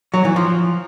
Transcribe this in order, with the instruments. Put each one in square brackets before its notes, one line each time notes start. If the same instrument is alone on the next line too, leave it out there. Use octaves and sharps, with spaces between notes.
[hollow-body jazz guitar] F#3
E3
F3